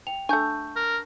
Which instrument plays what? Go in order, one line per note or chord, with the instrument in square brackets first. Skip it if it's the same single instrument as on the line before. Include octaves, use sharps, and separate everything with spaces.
[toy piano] G5 [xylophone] F7
[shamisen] A3 G#5 [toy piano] D4 A5 E6 [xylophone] C#6 G6
[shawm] A#4